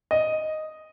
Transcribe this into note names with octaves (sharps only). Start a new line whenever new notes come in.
D#5